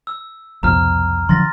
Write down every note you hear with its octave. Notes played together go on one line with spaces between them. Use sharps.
E6
C2 F2 B2 A#5 F6
D3 F3 F#3 C6 A6 A#6